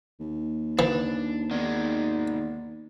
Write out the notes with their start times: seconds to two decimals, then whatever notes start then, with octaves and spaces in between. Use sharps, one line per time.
0.20 D#2
0.79 E3 D4
1.51 D#3 G#3 B3 D5